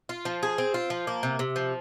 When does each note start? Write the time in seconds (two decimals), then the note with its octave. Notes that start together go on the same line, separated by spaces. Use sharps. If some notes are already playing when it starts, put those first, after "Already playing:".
0.09 F4
0.25 F3
0.43 G#4
0.58 C4
0.74 F4
0.90 F3
1.07 A#3
1.23 C3
1.39 C3
1.56 F3